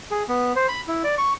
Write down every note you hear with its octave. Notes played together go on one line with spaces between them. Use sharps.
G#4
B3
C5
B5
E4
D5
C#6